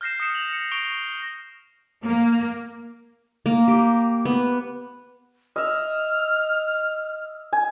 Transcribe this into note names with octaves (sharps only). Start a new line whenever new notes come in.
F6 G6 A#6 C7 E7
D#6 F6 A#6 C#7 E7
A#6 F7 F#7
C#7
C#6 D7 F7 G7
A#3
A#3
G4
B3
D#5 E5 F6
G#5